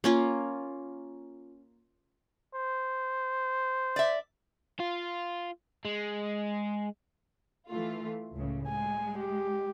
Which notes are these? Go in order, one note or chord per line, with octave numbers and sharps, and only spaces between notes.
A#3 C#4 F4
C5
D5 E5
F4
G#3
E3 A3 F4
C#2 A2 C#3
G#3 G#5
G4